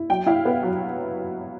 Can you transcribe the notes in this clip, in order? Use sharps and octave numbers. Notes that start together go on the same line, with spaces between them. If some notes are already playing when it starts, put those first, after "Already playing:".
Already playing: E4
F#3 G5
E4 F5
B3
F#3